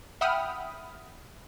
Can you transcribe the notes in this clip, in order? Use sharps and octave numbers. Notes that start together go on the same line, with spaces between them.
E5 F#5 G5 B5 D#6 F6